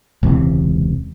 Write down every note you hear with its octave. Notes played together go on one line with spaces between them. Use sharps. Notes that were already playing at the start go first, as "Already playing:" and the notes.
E1 C#2 C3 E3